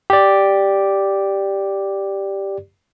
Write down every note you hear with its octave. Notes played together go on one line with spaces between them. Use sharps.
G4 D5